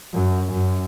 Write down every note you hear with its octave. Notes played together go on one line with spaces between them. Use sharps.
F#2
F#2